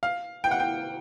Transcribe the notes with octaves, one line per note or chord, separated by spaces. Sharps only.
F5
G5
F#5
G5